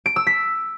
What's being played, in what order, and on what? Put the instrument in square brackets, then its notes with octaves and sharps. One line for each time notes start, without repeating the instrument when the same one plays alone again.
[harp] D7
E6
B6